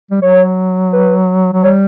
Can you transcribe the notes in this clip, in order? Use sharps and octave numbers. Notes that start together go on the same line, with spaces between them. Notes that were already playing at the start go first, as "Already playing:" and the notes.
G3
F#3 C#5
B4
F#3
G3 C#5